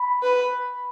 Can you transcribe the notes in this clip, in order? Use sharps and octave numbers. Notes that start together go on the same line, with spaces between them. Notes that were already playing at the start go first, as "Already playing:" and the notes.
Already playing: B5
B4